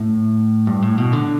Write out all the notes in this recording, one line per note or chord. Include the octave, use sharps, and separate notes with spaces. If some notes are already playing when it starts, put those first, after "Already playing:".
Already playing: A2
G2
A2
B2
D3